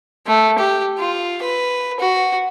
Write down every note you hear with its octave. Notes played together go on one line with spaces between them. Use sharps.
A3
G4
F4
B4
F#4